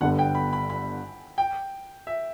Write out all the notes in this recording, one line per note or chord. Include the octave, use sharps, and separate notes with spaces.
G1 G2 D3 G3 B3 F#5
G5
B5
B5
B5
G5
E5